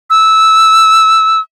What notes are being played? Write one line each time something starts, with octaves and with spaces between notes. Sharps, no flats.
E6